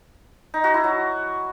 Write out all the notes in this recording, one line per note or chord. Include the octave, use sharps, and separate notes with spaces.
D#4
F#4
E4
F#3